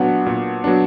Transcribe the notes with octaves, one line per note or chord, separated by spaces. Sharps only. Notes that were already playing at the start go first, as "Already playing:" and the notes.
Already playing: A#2 F#3 B3 D4 F#5
A#2
F#3 B3 D4